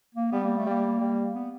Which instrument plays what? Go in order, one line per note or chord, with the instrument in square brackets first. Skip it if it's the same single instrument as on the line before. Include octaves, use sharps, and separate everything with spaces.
[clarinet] A#3
[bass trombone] G3 [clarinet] B3
[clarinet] A#3
A3
[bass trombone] G3 [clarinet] A#3
[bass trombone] G3
[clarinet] B3